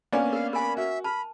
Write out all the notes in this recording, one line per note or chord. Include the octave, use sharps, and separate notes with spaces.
A#3 B3 C#4 D4 D5
A#4 F5
A#4 G#5 B5
F#4 E5
A5 B5 F6